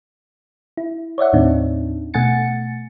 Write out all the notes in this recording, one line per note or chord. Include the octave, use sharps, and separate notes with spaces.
E4
C#5 D5 E5 F#5
D#2 A2 C4 D4 D#4
B2 A3 F#5 G#5 A6 C#7